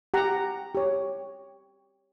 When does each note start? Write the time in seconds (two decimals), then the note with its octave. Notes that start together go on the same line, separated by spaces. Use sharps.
0.14 G4 F#5 A#5
0.75 G4 C#5